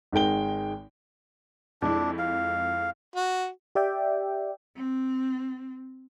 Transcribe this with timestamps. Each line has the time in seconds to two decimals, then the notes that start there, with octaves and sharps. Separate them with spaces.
0.12 G#1 D#3 G#3 G5 G7
1.82 F2 G#3 D4 E4
2.18 F5
3.16 F#4
3.75 G4 D5 E5 G5
4.76 C4